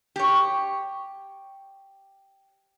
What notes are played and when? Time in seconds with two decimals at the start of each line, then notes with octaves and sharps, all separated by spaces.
0.16 G4 C#5